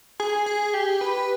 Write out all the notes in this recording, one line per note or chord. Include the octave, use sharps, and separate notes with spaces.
G#4
G#4
G4
B4